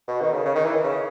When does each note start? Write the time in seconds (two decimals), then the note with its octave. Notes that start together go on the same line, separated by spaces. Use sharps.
0.08 B2
0.21 D#3
0.33 C#3
0.45 C#3
0.55 D#3
0.65 E3
0.75 D#3
0.84 C#3